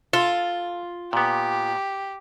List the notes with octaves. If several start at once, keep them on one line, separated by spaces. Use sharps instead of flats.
F4 A4
A#2 B3 G4